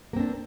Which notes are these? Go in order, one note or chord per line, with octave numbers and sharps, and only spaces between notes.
A#3 C4 D4